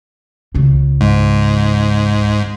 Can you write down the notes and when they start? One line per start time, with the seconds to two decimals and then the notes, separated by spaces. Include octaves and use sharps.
0.54 C#2 C#3
1.01 G#2